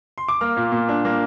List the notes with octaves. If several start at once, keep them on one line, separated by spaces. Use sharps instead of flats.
C6
D6
A#3 F6
A#2
A#2
D4
A#3